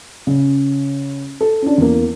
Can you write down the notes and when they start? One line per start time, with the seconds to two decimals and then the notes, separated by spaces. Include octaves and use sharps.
0.27 C#3
1.41 A4
1.62 C#4 D4
1.78 E2 A#3